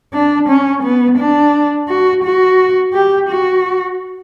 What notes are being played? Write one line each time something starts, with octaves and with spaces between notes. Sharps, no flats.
D4
C#4
B3
D4
F#4
F#4
G4
F#4